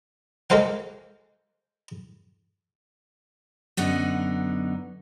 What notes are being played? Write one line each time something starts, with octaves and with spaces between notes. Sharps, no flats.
G#3 A#3 A4 C5 F5 F#5
F#2 D3 B3 D#4